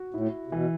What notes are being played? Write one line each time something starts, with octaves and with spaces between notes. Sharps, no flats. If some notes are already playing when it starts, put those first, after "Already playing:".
Already playing: F#4
A2 E4
C3
B2 E3